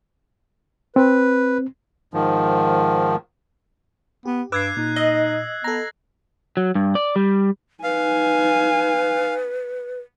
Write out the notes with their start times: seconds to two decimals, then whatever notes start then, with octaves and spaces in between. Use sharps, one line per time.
0.96 C4 B4
2.14 G#2 D#3 F3
4.25 B3 G4
4.52 G2 B4 D6 E6 F#6 G#6 C7
4.77 A#2 D#4
4.96 D#5 E6
5.64 B3 A4 A#5 A#6
6.57 F#3
6.75 G2
6.95 D5
7.16 G3
7.84 D#4 B4 F5 G#5